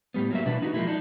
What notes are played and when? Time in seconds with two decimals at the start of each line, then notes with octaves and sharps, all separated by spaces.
0.14 A2 G3 B3
0.31 F#3 A#3 E5
0.45 B2 E3 D4 B4
0.62 D#4 E4 F#4
0.74 F3 G#3 A#3 E4
0.87 D4 D#4